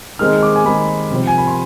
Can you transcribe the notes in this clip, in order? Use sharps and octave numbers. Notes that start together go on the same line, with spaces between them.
D#3 G#3 C4 D#4 F6
D6
G#5
D#3 G#3 C4 D#4 B5
C3 F3 C4
G#5
B5
C6